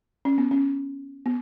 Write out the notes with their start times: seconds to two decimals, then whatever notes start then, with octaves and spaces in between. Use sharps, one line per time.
0.25 C#4
0.38 B3
0.51 C#4
1.26 B3